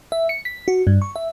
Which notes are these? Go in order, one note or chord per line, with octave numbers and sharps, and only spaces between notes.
E5
C#7
B6
F#4
G2
C#6
E5